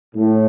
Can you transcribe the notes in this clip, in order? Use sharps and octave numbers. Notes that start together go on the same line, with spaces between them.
A2